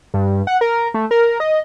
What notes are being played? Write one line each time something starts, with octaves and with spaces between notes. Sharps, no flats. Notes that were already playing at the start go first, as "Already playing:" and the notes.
G2
F#5
A#4
A3
A#4
D#5